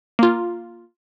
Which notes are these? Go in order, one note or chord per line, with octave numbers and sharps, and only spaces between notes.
A#3 F4